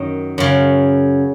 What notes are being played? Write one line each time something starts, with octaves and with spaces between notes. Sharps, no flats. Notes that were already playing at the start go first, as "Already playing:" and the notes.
Already playing: F#2 D#3
F#2 C#3